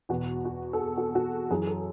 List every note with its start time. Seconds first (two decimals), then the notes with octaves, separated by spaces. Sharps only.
0.09 E2 B2 F#4
0.45 F#4
0.73 A4
0.80 G#4
0.97 F#4
1.15 F#4
1.51 F#2 E3 G#4
1.62 G#4
1.67 A4